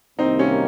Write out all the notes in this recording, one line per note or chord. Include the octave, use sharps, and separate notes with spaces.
C2 C3 D#3 A#3 C4 D#4
C#4